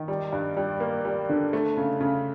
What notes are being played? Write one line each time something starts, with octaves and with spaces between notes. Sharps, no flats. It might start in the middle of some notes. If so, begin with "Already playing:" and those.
Already playing: D#3
G3
G2
G3
A#3
G3
D3
A3
C#3
C#3